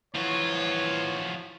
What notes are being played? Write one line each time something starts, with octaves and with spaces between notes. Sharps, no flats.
E3 F3 F4 F#4 C#5